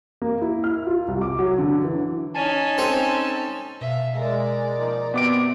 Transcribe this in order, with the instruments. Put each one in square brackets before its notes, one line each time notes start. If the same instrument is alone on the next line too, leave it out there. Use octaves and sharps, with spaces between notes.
[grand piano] A#3
E4
F6
F4
C2
D6
F#3
D3
E3
[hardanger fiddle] C#4 D#4 [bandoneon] G#5 A5
[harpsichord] C4 A4
[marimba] B2 [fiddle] E5 F5
[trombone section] G#3 [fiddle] A#4 D5
[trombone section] F3 A#3 D#4
[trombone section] C3 [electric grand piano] B3 D6 D7 [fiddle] F#4 D5